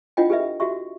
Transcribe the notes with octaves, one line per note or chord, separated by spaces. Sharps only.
D4 E4 F4 D#5 F#5 G5
G4 A4 B4 D#5 E5
F#4 G4 E5 C#6